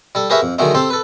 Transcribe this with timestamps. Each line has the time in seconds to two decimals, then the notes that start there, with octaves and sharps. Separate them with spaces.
0.15 G3 A4
0.30 G4 G#4 A#4 B4 C#5 E5
0.42 F2
0.59 D3 D#3 F#3 G#3 A3 D#4
0.74 C4 G4 A4 C6
0.90 A4 B4